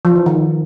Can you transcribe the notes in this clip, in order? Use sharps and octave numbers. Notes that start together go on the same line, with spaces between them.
F3
E3
D#3